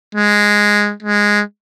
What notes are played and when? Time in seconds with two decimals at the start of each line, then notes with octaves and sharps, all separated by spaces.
0.15 G#3
1.03 G#3